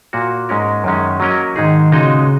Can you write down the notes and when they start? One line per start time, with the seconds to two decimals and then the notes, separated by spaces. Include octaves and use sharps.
0.13 A#2 A#3 F#4
0.49 G#2 G#3 C#4 A#4
0.84 F#2 D#3 G#3 C#4
1.20 F#3 A#3 C#4 A#4 D#5
1.56 G#2 D#3 G#3 D#4 G#4
1.92 A#2 C#3 G#3 D#4 F#4 D#5